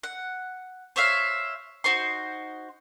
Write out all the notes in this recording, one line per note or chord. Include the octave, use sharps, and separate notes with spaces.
F#5
C5 C#5 E5 F5
D#4 F#4 C5 C6